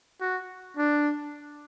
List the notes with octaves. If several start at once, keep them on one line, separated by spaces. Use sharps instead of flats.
F#4
D4